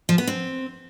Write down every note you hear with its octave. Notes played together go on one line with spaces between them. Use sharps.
F3
B3
C4